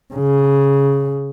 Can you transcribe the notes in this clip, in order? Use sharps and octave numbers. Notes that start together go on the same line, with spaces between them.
C#3